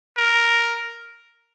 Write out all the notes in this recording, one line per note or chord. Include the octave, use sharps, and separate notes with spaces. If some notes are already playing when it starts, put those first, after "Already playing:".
A#4